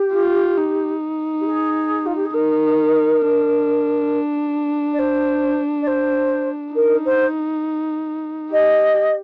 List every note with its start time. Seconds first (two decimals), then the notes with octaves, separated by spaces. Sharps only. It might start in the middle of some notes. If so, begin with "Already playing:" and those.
Already playing: G4
0.14 F4
0.58 D#4
1.40 G4
1.46 G#4
2.06 F4
2.16 G4
2.24 G#4
2.34 D#4 A#4
3.22 D4
4.93 D5
4.98 C5
5.82 D5
5.87 C5
6.75 D#4 A#4
7.05 C5
8.52 G4 D#5